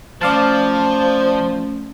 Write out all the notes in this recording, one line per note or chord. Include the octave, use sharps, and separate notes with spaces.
F3 A3 C#4 C5 D5 F5 A5